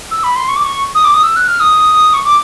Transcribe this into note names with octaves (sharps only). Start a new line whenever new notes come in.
E6
B5
C6
C#6
D6
C#6
D#6
D6
D#6
E6
F#6
F6
D#6
C#6
D6